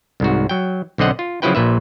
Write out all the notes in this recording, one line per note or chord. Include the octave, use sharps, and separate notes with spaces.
C2 G#2 F#4
F#3 G5
B1 D3 C4 D#5 F#5
F4
C#3 F3 F#3 E4 B4 G5
A#1 A#2 B4 E5